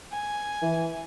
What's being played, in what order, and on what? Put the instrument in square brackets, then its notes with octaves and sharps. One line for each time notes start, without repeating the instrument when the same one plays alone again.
[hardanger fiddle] G#5
[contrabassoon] E3